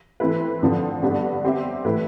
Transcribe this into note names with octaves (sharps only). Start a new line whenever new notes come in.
E3 A3 C4 E4 B4
F2 D3 F3 C4
G2 D3 G3 B3 D4
G3 C4 G4 C5 E5
A2 E3 A3 E4 B4